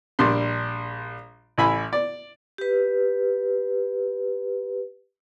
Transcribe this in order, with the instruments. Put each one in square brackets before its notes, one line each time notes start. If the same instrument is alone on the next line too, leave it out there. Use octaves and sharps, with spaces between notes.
[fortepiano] A#1 G3 D4 C6
A1 E4 G#5 B5
D5
[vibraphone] G4 B4